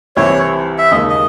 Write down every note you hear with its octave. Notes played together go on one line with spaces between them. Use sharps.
C2 C3 E3 C4 E4 C#5
E5
D#2 C#3 G#3 D#5
D#5